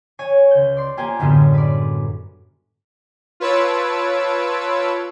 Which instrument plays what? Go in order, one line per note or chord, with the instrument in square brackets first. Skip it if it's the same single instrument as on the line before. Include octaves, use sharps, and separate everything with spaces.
[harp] C#5 G#5
C#2 G6
D5 C6
A#3 F4 G4 C5 G5 G#5
F#2 A2 D3 G3 G#3 B3
B4 D5
[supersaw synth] F4 B4 C#5 A5 E6 D7